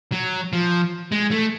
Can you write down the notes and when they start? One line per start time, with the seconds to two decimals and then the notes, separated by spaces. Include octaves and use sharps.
0.12 F#3
0.53 F3
1.12 G#3
1.31 A3